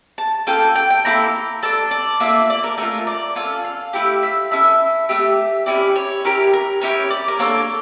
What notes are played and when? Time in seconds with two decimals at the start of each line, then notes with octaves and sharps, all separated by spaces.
0.18 A5
0.47 A#3 C#4 F4 A4 G5
0.76 G5
0.90 G5
1.05 A#3 E4 A4 A#5
1.63 D4 A4 A5
1.91 D5
2.20 A#3 D4 F4 A4 E5
2.50 D5
2.64 A#4
2.78 A3 C#4 F4 A#4
3.07 D5
3.36 C#4 F4 A4
3.65 F5
3.93 A3 E4 G4
4.23 E5
4.51 C#4 E4 A4 E5
5.09 A3 C#4 G4 E5
5.66 C#4 E4 G4 D5
5.96 C#5
6.25 C#4 E4 G4 A#4
6.54 A#4
6.81 C#4 E4 G4 C#5
7.10 D5
7.28 A#4
7.39 A#3 D4 A4 C#5